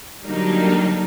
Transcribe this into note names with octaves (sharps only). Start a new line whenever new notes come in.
D3 F#3 G3 A#3 D4 D#4